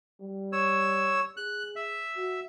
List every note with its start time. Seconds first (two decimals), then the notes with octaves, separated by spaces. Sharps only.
0.21 G3
0.53 C#5 E6
1.37 G#4 F#6
1.76 E5
2.16 F#4